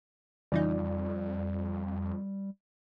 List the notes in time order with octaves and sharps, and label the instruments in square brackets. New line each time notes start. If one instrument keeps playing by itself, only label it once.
[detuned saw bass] F2 [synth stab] C#3 E3 D#4 [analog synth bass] G3 [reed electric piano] F4 D5